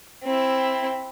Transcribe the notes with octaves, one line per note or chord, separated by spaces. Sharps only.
C4 E4